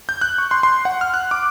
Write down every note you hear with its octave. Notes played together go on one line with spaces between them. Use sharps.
G6
F#6
C#6
C6
C6
F#5
F6
F#6
D6